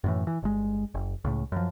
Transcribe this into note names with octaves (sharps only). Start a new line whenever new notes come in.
F#2 A2 E3
E3
G1 G#3
F#1
C#2 A2
F#2 F3